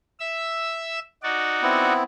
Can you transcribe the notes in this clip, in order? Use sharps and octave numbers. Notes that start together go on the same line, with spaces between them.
E5 E6
D#4 F#4 D5
B3 C4 E4